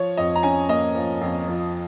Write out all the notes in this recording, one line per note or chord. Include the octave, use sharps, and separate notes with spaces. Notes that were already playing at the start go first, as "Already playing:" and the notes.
Already playing: F3 C#5
F2 D#5
A#5
C#4 G#5
A#3 D#5
F3
F2
F3